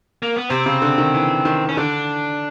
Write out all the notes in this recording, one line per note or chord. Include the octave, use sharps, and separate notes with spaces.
A#3
B3
C3 C4
C#3
D3
D#3
E3
D#3
C#4
D3 D4